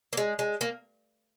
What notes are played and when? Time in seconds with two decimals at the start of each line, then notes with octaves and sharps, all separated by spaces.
0.13 A#3
0.17 G#3
0.39 G#3
0.61 A#3